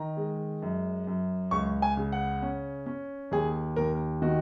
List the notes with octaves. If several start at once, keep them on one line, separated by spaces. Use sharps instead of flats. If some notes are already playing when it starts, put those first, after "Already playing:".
Already playing: D#3 A#5
G#3
F#2
F#2
C#2 C#6
G#5
C#3
F#5
C#4
C#4
D#2 G#4
D#2 A#4
D#3 F#4